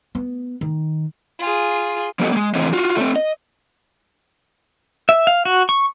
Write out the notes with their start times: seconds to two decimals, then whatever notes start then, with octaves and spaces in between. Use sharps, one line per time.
0.15 B3
0.61 D#3
1.40 F4 G#4
2.19 F3 G3 B3 G4 A4 D#5
2.32 G#3 A#3
2.55 A2 C#3 E3 C4 G#4 D#5
2.73 F4 F#4
2.97 A3 C4
3.16 D#5
5.09 E5
5.27 F5
5.45 F#4
5.69 C#6